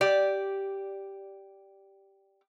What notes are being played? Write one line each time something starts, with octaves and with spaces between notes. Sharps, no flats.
G4 D5